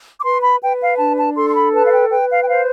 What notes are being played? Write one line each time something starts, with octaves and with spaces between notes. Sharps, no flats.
D6
B4 C6
B5
B4 G5
F5
D4 A5
A5
A4 C6
C6
B5
B4 A5
F5
G5
B4 G5
F5
G5
C5 F5